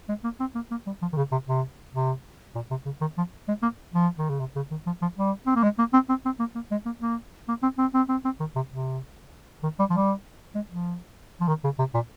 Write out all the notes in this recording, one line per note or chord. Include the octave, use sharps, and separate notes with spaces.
G#3
A#3
C4
A#3
A#3
G3
F3
D#3
C#3
C3
C3
C3
A#2
C3
C#3
D#3
F3
G#3
A#3
F3
D#3
C#3
C3
C#3
D#3
F3
F3
G3
C4
A#3
G#3
A#3
C4
C4
C4
A#3
A#3
G#3
A#3
A#3
A#3
C4
C4
C4
C4
C4
D#3
C3
C3
D#3
G3
F3
G3
G#3
F3
F3
D#3
C#3
C3
A#2